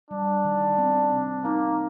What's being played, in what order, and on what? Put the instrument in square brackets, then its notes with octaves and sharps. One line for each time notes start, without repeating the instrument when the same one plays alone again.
[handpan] G3 [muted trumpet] D4
[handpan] D#3
C4
C3
[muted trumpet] A#3 [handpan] D#4